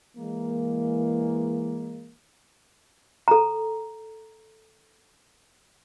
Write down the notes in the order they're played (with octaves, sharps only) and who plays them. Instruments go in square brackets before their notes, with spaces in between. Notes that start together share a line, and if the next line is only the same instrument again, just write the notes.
[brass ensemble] E3 G#3 A#3
[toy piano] A4 A#5